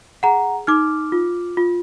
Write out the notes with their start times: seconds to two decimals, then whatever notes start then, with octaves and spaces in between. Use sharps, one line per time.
0.23 G#4 F#5 A#5
0.67 D#4 D6 F6
1.12 F4
1.57 F4